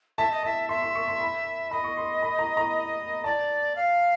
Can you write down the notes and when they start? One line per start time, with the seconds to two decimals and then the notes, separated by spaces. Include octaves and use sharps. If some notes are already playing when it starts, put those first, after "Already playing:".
0.18 E5 A5
0.32 D#5
0.43 E5 A5
0.69 E5 C6
0.82 C6
0.95 C#6
1.08 C6
1.20 B5
1.71 D#5 B5
1.84 C#6
1.97 C6
2.22 B5
2.39 A#5
2.57 A#5
3.24 D5 A5
3.76 F5